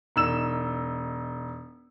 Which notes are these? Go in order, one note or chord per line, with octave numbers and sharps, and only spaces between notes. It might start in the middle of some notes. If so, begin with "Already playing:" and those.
E1 D#4 E6 E7